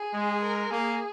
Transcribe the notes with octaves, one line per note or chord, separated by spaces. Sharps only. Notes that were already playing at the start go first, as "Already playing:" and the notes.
Already playing: G#4
G#3
A#4
A#3 G#4